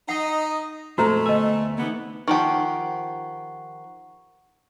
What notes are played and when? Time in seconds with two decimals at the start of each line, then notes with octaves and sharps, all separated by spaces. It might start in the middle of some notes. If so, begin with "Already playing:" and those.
0.09 D#4 D#5 F#5
0.98 F2 A#2 G#3 A3 F#4 C5 A#5
1.26 D2 B3 A#4 D#5 G#5
1.78 C3 E3 A#3 B3 D#4
2.28 D#3 F3 G4 F#5 C#6